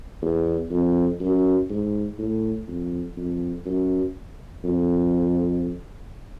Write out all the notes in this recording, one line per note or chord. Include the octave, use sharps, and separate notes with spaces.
E2
F2
F#2
G#2
A2
F2
F2
F#2
F2